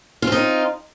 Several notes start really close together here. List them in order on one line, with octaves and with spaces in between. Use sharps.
F4 C4 D#4